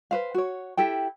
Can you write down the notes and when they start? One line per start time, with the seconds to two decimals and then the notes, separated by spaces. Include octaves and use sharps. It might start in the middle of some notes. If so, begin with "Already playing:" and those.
0.11 B4 C5 F5
0.34 F#4 C#5
0.77 E4 G4 A4 G5